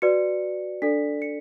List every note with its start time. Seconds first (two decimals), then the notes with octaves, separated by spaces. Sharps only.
0.02 F#4 B4 D5 C#7
0.82 D4 A4 D5 B6
1.22 C#7